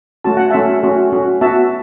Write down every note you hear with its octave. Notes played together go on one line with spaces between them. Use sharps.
A3 C#4 F#4 A5
F#5
A3 C#4 F#4 E5 A5
A3 C#4 F#4
A3 C#4 F#4
B3 F#4 E5 A5